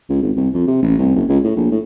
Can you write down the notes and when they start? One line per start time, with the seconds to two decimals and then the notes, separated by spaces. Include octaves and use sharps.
0.10 C#2
0.23 G#1
0.37 C2
0.54 F2
0.67 C3
0.82 A1
0.99 C2
1.16 F#1
1.29 C#2
1.44 A2
1.57 A#1
1.72 A2